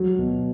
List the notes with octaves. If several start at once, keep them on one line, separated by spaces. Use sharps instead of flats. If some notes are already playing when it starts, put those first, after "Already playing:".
Already playing: F#3
B2